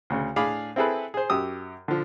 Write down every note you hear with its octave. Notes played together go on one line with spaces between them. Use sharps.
D2 C#3
A2 D4 G#4 F5 B5 D6
C4 E4 G#4 A4 B4
G#4 C5
F#2 G4 D#6 E6
D3 F3